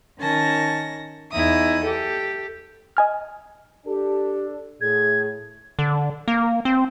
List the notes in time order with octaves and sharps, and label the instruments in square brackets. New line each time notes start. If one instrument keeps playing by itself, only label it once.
[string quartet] D#3 C#4 A5 A#6
E2 D#4 E4 E5 D#6
G4 A4
[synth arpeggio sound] D#5 G#5 F6
[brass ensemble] D4 A4 [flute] G4
[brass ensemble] A2 [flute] G#4 [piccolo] G#6
[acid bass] D3
A#3
C4